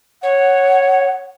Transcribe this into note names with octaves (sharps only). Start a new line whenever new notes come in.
C#5 F#5